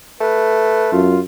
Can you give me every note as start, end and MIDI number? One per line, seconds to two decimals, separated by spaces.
0.21 1.15 57
0.21 0.90 71
0.92 1.22 42
0.92 1.20 65